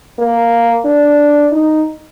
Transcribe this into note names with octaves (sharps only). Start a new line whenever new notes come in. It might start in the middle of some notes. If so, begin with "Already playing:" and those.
A#3
D4
D#4